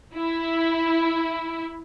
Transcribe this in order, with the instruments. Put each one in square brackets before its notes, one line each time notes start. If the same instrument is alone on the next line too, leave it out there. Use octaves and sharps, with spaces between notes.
[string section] E4